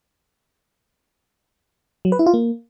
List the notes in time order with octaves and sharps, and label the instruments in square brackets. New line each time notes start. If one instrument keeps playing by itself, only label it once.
[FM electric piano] F#3
B4
E4
F4
A#3